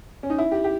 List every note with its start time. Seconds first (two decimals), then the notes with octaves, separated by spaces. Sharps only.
0.23 C#4
0.30 D#4
0.38 E4
0.52 G4
0.64 G4